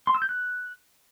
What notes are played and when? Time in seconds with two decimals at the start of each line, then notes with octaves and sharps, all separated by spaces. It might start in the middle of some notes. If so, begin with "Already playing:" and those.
0.07 C6
0.15 E6
0.22 G6
0.29 F#6